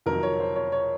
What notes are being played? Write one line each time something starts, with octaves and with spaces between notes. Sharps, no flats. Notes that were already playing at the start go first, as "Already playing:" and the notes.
F2 C3 D#3 F#3 A#4
C#5
C5
C#5
C#5